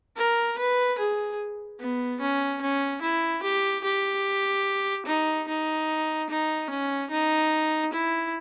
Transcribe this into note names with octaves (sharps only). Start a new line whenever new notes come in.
A#4
B4
G#4
B3
C#4
C#4
E4
G4
G4
D#4
D#4
D#4
C#4
D#4
E4